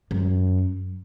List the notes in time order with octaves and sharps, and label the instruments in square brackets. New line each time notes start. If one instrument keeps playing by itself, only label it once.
[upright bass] F#2